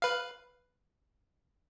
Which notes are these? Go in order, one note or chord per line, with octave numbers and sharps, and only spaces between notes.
B4 F5